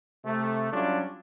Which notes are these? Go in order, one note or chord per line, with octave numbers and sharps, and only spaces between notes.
C3 A3
F#3 G3 C#4 D4 F4